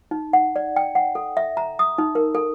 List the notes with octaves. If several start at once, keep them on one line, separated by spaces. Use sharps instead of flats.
D#4
F#5
D5
G5
F#5
A4
E5
A#5
D#6
D#4
A#4
A4